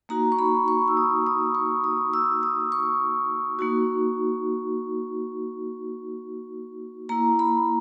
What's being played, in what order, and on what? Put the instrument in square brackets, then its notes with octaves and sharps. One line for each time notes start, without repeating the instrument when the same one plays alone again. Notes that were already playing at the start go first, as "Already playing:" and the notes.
[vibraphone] A#3 D#4 F#4 A#5
C#6
B5
C#6
E6
D#6
D#6
C#6
D#6
E6
D#6
C#6
A#3 D#4 F#4
A#3 E4 A#5
B5